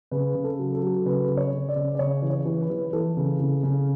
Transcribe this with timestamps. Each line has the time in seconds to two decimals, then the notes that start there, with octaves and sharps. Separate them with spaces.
0.11 C#3 B4
0.35 C#3
0.44 A4
0.59 F#3
0.74 A4
0.82 F#3
1.06 C#3 B4
1.29 C#3
1.37 C#5
1.53 C#3
1.69 D5
1.76 C#3
1.95 D5
1.99 C#3 C#5
2.22 E3
2.30 C#5
2.45 E3
2.61 B4
2.70 E3
2.93 E3 A4
3.17 C#3
3.40 C#3
3.63 C#3